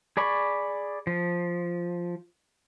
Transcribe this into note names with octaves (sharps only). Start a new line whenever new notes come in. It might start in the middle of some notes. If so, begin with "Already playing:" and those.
G#4 D5 B5 C#6
F3